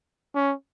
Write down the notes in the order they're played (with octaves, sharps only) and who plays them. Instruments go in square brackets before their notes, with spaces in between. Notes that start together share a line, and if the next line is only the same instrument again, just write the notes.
[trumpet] C#4